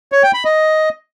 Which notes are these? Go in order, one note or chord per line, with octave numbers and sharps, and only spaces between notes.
C#5
G5
B5
D#5